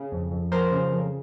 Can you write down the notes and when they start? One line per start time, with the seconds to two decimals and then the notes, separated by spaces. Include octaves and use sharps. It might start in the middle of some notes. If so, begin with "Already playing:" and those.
Already playing: C#3
0.12 F2
0.31 F2
0.52 F3 A#4 C5
0.72 C#3
0.91 F2